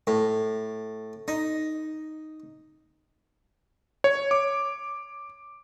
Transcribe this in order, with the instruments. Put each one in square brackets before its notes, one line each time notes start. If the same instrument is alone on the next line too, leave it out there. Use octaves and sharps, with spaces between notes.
[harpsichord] A2
D#4
[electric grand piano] C#5
D6